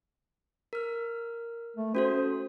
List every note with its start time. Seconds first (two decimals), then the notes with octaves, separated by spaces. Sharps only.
0.73 A#4 F6
1.77 A3
1.95 C#4 F#4 A4 C5